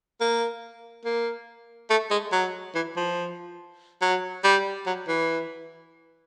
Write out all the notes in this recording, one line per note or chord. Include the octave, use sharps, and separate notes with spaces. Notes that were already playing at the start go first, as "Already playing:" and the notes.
A#3
A#3
A3
G#3
F#3
E3
F3
F#3
G3
F#3
E3